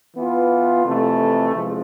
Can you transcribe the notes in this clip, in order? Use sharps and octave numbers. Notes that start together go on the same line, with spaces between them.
E3 B3 F4
F2 C3 E3 A3
E2 C3 F3 G#3